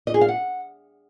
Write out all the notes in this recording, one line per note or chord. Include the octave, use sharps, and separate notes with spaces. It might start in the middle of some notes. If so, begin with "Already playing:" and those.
D#5
G#4
F5
F#5